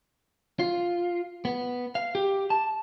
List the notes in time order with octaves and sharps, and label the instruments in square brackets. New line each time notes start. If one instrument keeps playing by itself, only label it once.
[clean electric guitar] F4
B3
F5
G4
A5